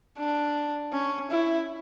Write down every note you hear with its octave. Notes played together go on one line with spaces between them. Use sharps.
D4
C#4
E4